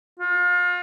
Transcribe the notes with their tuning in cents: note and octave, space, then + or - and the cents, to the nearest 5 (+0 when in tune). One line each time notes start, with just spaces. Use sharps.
F4 +35